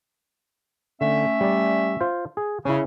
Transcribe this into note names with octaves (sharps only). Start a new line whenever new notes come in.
D3 A3 C#4 E5
G3 D5
F4 C5
G#4
C#3 C#4 E4